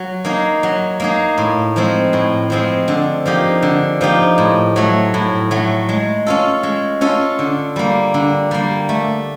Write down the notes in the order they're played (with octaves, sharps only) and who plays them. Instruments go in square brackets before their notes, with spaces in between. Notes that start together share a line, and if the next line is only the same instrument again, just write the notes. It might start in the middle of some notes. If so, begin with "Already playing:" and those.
Already playing: [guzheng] F#3
A#3 D#4 G#4
F#3
A#3 D#4 G#4
A2
F3 G#3 C4
A2
F3 G#3 C4
D3
F3 A#3 D#4 G4
D3
F3 A#3 D#4 G4
A2
F#3 A3
A2
F#3 A3
G#3
C#4 F4 A4
G#3
C#4 F4 A4
D3
G3 A#3
D3
G3 A#3
A3